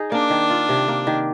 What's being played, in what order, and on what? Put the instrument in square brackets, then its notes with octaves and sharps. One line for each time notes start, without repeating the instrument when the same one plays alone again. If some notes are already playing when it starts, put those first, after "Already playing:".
Already playing: [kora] D#4 G#4
[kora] A#3 [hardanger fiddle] D4
[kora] D#3
F4
C3
A#3
D#3